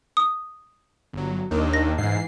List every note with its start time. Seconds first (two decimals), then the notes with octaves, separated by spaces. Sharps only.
0.17 D#6
1.13 G1 F#3
1.51 D#2 D#3 D4 D#4
1.73 A#6
1.98 G#2 E3 C7